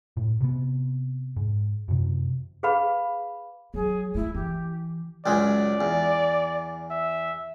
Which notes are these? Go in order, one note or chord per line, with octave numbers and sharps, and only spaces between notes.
A2
C3 B3
G#2
F#2 C3
G#4 B4 F5 B5
F#3 G#4
A3 E4
E3 G4
C#2 F#2 G#3 D5
E2
E5